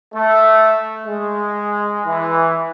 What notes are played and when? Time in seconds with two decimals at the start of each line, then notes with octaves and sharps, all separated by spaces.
0.14 A3
1.06 G#3
2.05 E3